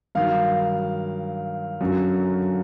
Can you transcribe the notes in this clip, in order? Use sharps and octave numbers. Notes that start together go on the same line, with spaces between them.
G2 D#3 F#3 F5
F#2 D3 F#3